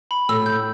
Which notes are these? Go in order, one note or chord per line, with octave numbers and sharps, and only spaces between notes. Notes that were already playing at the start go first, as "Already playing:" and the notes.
B5
A2 E6
G6